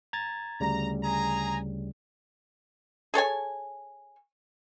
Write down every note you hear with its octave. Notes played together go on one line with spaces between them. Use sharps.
A#5 G#6 A6
D2 C#3 G3 A#5
G#4 G#5 A#5
G#4 A4 C#5 G#5